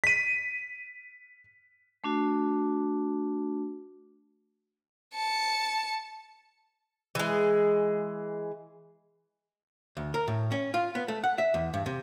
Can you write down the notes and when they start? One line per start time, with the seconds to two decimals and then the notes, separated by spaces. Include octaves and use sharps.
0.04 B6 D#7
2.04 A3 D4 F#4
5.15 A5 C#7
7.15 E3 G#3
9.97 D2
10.14 A#4
10.28 A2
10.52 C#4
10.74 F4
10.95 B3
11.08 A3
11.24 F#5
11.38 E5
11.54 E2
11.74 G2
11.86 C3